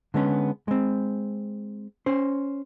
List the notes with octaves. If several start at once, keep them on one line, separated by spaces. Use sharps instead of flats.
D3 G#3 B3 C#4
G#3 C4
C#4 C5